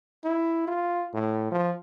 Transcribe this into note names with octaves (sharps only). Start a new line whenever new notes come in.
E4
F4
A2
F3